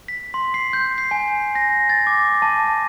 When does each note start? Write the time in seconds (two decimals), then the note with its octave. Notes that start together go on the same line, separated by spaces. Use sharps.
0.08 B6
0.34 C6
0.54 C7
0.73 G6
0.98 C7
1.11 G#5
1.55 A#6
1.90 A6
2.07 D6
2.42 A5